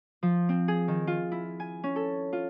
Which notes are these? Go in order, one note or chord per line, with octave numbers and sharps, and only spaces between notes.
F3
C4
G#4
D#3
F4
E4
G#5
C#4
A4
F4